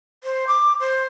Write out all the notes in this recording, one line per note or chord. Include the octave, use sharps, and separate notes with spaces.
C5
D6
C5